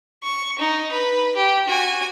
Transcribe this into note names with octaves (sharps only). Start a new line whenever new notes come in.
C#6
D#4
B4
G4
F#4 G#5